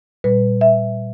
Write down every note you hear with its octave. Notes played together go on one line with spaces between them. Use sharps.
A#2 G3 B4
E5